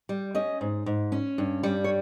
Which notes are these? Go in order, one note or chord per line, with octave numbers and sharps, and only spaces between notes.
G3
C#4 D#5
G#2
G#2
C#4
G2
G3
C#5